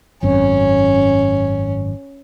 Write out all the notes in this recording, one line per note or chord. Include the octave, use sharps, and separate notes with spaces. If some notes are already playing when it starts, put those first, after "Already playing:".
G#1 F#2 C4 C#4